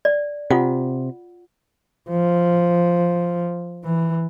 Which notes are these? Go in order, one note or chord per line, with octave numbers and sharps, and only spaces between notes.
D5
C3 F4 F#5
F3
E3